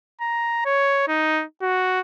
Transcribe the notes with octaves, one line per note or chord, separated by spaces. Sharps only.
A#5
C#5
D#4
F#4